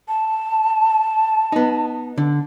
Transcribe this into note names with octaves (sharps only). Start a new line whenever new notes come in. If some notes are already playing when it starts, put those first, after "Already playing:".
A5
B3 D#4
D3